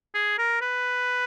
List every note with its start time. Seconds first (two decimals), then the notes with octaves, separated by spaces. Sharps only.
0.15 G#4
0.38 A#4
0.61 B4